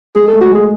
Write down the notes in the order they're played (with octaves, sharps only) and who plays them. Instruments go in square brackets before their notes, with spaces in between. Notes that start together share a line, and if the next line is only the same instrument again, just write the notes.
[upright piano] G#3 [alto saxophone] G#4
[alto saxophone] A4
[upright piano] A3
[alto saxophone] F#4
[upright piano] G#3 [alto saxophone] G#4